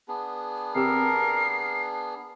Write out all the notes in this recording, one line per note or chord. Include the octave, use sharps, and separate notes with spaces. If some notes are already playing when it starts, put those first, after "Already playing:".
B3 D4 G#4
C3 G4 A#4 E6 C7